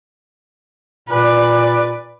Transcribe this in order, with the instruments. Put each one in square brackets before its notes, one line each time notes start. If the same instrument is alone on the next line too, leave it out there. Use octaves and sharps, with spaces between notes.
[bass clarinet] A#2 [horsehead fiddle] B4 D5